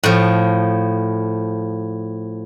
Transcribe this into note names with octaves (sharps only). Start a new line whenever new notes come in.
A2 F3